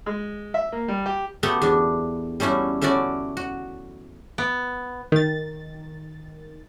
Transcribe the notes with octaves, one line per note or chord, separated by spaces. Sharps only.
G#3
E5
A#3
G3
G4
A3 B3 F#4 G4 A4
E2 D4
G3 A3 C#4 E4 F#4
A3 C#4 E4 F#4 D5
F#4
B3
D#3 A6